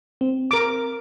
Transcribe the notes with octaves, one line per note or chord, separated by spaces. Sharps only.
C4
A#4 D6